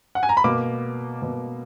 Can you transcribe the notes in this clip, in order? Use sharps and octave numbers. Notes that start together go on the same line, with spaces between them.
F#5
G#5
A#5
B5
B2 A#3 D6
B2 A#3